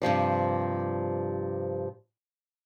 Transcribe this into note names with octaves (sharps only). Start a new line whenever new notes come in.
G2 C3 F3 G3